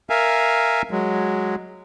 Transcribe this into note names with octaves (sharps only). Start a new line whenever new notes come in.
A#4 E5 F5 G#5
F#3 G#3